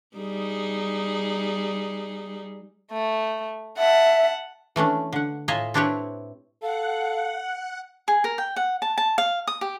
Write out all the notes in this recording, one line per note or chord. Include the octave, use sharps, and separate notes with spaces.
G3 D#4 G#4
A3
E5 F#5 A5
E3 A3 C#4 D4
D3 F#5
A2 F4 D#5 E5 G#5 A#5
C4 D4 E4 G4 B4 C#5
A4 F5 F#5
G#4
A#4
G5
F#5
A5
A5
F5
D#6
G4